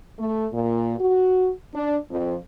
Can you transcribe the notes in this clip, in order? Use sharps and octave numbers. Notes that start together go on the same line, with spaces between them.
A3
A#2
F#4
D4
F2